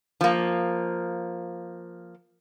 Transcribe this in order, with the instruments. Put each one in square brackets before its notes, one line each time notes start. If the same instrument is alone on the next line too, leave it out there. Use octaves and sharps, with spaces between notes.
[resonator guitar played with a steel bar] F3 A#3